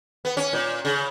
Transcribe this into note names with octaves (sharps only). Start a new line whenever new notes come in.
B3
C#4
A#2
C#3